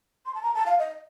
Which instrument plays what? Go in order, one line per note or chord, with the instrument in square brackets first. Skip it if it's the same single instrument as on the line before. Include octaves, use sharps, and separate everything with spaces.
[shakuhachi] C6
A5
A#5
A5
F5
D#5